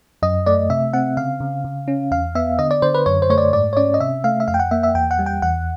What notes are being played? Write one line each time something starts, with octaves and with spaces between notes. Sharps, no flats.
F#2 D#5
A3 D5
C3 E5
C4 F#5
C#3 F5
C#3
C#3
C#4
E2 F5
B3 E5
D3 D#5
D5
D3 C5
B4
F#2 C#5
C5
A3 C#5
D5
G#2 D5
C#5
C#4 D5
D#5
C3 E5
A3 F5
E5
F2 F5
G5
F#5
A#3 E5
E5
E2 G5
F#5
G3
G5
E2 F#5